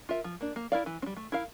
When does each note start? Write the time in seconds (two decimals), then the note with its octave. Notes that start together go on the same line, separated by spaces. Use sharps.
0.09 F4 A#4 E5
0.24 F3
0.41 A#3 D4
0.56 A#3
0.72 E4 A#4 D5 F5
0.86 E3
1.02 C4
1.06 G3
1.17 A3
1.32 E4 A#4 F5